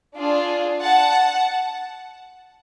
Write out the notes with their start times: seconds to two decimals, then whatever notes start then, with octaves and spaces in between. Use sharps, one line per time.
0.17 D4 F4 G#4
0.81 F#5 A5